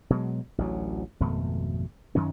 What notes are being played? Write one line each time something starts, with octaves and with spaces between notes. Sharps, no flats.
B2 F#3 G#3
A1 D2 F#3
G#1 F2 B2 A3
F#2 D#3 F#3 C#4